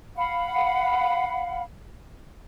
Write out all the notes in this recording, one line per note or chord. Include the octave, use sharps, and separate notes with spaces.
F5 F#5 B5